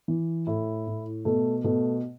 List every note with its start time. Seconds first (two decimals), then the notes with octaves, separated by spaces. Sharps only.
0.08 E3
0.47 A2 E4
0.87 A2
1.25 B2 A3
1.64 B2 A3